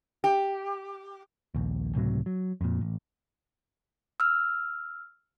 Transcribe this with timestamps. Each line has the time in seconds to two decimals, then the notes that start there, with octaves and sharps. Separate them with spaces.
0.24 G4
1.55 A#1 D#2
1.95 C#2 A2 C3 F#3
2.26 F#3
2.61 F2 A#2
2.81 A1
4.20 E6 F6